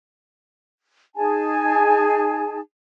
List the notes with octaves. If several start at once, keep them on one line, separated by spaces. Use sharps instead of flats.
D#4 G#4 G#5 A5